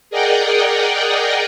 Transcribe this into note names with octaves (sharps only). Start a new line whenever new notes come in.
G#4 A#4 D5 D#5 F#5 G5